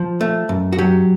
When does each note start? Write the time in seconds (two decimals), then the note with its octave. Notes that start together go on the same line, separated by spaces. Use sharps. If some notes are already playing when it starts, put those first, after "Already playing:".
Already playing: F3
0.21 A3
0.49 F#2
0.72 F#4
0.78 F#3 G4